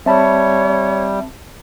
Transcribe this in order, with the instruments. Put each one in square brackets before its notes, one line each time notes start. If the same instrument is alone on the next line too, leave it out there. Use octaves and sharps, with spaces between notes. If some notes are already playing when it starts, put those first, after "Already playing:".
[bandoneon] G3 [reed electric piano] C4 A5 B5 [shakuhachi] C#5 [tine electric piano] E5